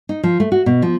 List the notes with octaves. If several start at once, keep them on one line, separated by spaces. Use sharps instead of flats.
D#4
F3
A3
F#4
B2
F3